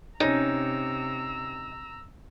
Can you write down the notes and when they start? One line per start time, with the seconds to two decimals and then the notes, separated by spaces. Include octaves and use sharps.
0.20 C3 C#4 D#4 A#5 E6